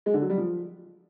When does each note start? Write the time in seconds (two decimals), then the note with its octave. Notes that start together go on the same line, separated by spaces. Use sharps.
0.06 G#3
0.14 D3
0.22 F#3
0.30 G3
0.38 F3